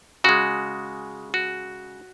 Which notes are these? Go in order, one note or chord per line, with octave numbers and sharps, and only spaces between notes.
C#3 G#3 F#4
F#4